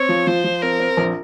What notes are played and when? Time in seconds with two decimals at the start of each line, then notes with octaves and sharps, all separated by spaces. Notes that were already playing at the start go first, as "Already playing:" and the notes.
Already playing: C4 C#5
0.09 F3
0.27 F3 C5
0.44 F3
0.62 C4 A#4
0.80 C4
0.97 A#1